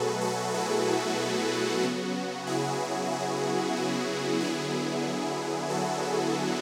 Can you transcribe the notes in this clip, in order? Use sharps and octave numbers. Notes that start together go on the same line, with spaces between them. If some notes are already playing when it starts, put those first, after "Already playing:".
Already playing: B2 F#3 A3 F#4 G#4 A4 B4
F#4 A4
E4 G#4
E4
C#3 F#3 B3 F#4
E4 G#4
F#4
F#4
D3 F#3 B3 E4 G#4
F#4 A4